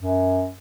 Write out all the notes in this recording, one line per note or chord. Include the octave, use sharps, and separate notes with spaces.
F#2